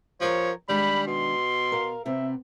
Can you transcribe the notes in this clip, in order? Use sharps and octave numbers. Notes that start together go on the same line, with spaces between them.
F3 G4 A#4 C#5
D#3 G3 G#3 D4 B5
B2 C6
A#4 F5
C3 B3 C4 E5